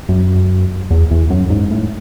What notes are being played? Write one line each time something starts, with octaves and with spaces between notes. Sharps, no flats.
F#2
E2
E2
F#2
G#2
A2